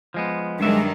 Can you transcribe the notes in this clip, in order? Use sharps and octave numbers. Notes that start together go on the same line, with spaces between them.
F3 G#3 B3
G2 D#3 F#3 G#3 D4 E5